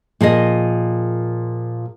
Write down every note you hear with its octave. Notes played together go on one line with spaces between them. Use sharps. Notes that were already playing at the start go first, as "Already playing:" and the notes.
A#2 F3 G#4 D#5